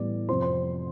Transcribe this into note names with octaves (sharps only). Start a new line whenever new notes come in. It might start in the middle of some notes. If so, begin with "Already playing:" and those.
Already playing: A2 E3 G3 B3 D5
F2 C3 F3 C5 C6
C5 C6